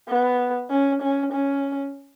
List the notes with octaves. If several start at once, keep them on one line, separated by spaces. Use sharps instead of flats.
B3
C#4
C#4
C#4